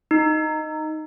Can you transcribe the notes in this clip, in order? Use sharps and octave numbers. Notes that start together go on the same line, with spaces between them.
D#4